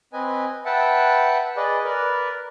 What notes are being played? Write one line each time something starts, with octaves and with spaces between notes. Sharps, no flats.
C4 B4 D#5 G#5
B4 E5 F#5 G5 A5
G#4 B4 D5 D#5
A#4 B4 D5